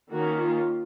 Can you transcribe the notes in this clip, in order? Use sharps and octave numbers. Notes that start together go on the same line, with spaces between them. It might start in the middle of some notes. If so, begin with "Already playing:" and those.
D#3 A#3 C#4 F#4
F4